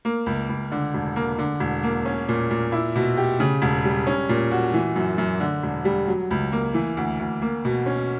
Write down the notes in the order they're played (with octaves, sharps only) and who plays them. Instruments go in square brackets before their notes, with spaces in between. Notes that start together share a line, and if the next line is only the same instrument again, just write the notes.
[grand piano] A#3
C#2
C#2
D3
E1
A#3
D3
E1
A#3
C#4
A#2
A#2
E4
B2
G4
C#3
E1
G3
C#4
A#2
F#4
E3
F#2
F#2
D3
E1
G3
F#3
C#2
A#3
E3
D2
D2
A#3
B2
C#4